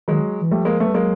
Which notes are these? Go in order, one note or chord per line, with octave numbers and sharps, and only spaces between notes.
D#3 F#3 G#3
E3
F3 G3 A3
G#3 A#3
A3 B3
G3
F#3 G#3 A#3